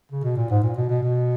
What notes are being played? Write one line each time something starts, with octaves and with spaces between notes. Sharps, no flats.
C#3
B2
A#2
G#2
A#2
B2
B2
B2